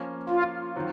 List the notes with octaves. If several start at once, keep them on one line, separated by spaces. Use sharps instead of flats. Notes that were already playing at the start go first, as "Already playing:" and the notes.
Already playing: F3 A#3 C#4
F4
D#3 F#3 C4 F4